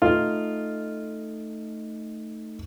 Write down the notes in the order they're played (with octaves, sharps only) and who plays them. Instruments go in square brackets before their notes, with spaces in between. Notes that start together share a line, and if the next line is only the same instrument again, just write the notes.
[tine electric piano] A3 D#4 D#5 [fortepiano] F4